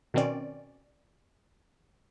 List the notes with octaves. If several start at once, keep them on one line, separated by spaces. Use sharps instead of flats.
B2 D#3 C4 C#4 D5